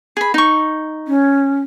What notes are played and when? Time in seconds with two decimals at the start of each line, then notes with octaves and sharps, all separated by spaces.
0.17 G#4 B5
0.34 D#4 C#6
1.08 C#4